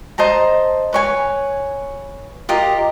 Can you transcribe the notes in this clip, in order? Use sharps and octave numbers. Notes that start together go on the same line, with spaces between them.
C5 D#5 A5 A#5
B4 C#5 G#5
F4 G4 A#4 D#5